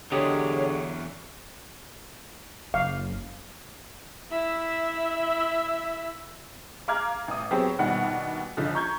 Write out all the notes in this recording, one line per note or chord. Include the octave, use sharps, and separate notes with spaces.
E2 D3 F#3 G#3 G4 C#5
F#1 F5
E4 E5
F5 A#5 D6 F6 F#6 G#6
A1 D#6
F#3 B3 C4 G4 G#4 C5
A#1 B2 D#3 G3 F#5
C#2 D3 F3
A#5 C#6 G6 G#6